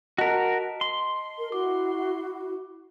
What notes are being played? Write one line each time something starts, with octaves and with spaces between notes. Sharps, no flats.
F#4 A#4 D#5 A5 B6
C6
A#4
E4 F#4 D6